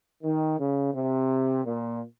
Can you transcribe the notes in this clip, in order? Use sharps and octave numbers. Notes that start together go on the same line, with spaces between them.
D#3
C#3
C3
A#2